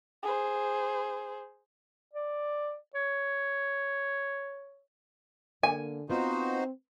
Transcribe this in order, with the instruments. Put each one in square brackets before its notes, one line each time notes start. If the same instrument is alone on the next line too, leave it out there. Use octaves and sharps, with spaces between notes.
[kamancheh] G#4 C5
[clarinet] D5
C#5
[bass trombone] D3 [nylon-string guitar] A#3 [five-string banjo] G#5
[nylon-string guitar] B3 F4 [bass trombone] C4 [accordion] D#4 F#4 C5